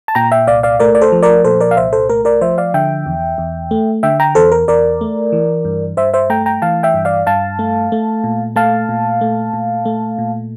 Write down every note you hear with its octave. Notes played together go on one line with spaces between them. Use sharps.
A5
A#2 G5 A#5
E5 G5
C2 D5 F5
D5 F5
A3 A#4 D5
D5
A4 C5
F3
A#4 D5
A#2 A4 C5
A#4 D5
F5
C2 C5 E5
A4 C5
A3 A#4
A#4 D5
F3 C5 E5
D5 F5
D3 E5 G5
E2
E2
A3
D3 E5 G5
G5 A#5
E2 A4 C5
A#4
E2 A#4 D5
A3
E3
G2
G2 C5 E5
C5 E5
A3 G5 A#5
G5 A#5
E3 F5 A5
E5 G5
G2
D5 F5
G2 F5 A5
A3
A3
A#2
A3 F5 A5
A#2
A3
A#2
A3
A#2